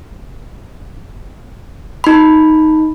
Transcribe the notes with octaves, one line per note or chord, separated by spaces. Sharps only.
D#4 B5